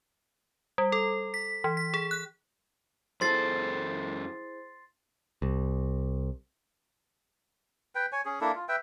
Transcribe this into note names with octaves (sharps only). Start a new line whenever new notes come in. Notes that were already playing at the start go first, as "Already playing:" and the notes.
G3
A4
B6
E3
B6
G#4
F#6
F#2 E4 G#4 A4 C5 C6 A6 C7
C2
B4 G5
C#5 G#5
C#4 G#4
A#3 D4 E4 A4
F4
B4 E5 G5